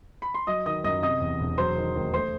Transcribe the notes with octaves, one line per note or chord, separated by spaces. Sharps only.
B5
C6
F#3 D#5 D#6
D#3 D#5 D#6
F#2 D#5 D#6
C3 D#5 D#6
E2
E1
F#3 C5 C6
D#3
D#2
A3 C5 C6